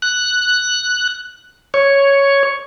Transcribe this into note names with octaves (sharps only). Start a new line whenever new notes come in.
F#6
C#5